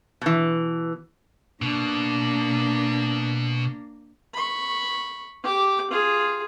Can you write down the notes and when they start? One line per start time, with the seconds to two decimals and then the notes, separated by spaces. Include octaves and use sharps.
0.21 B2 E3
1.62 B2 A#3 D4
4.33 B5 C#6
5.43 G4 D6
5.90 F4 G#4